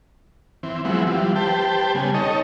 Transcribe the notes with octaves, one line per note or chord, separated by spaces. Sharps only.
E3 C4
F3 F#3 G#3 B3 C4 E4
E3 F3 G3
G4 B4 C5 G5 A5
C#3 G3 B3 G#5
D#4 A4 C#5 D#5